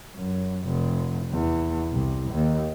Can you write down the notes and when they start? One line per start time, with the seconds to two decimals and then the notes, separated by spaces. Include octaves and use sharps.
0.16 F#2
0.66 F1
1.31 E2
1.92 C2
2.31 D#2